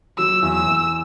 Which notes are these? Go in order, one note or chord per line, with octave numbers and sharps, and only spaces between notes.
F#3 E6
E2
E6
E2